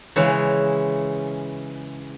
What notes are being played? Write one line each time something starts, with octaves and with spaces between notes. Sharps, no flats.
C#3 E3 G#3 C#4